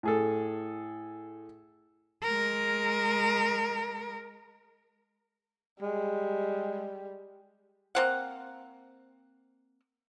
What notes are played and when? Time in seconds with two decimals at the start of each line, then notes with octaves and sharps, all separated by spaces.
0.03 A2 G#4 A4
2.23 G#3 A#4
5.82 G3 G#3
7.95 A#3 C4 F#5